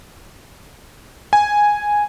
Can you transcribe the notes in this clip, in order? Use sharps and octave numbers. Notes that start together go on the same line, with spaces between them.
G#5